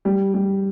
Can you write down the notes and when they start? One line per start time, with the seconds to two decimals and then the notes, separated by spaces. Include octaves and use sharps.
0.05 G3
0.34 G3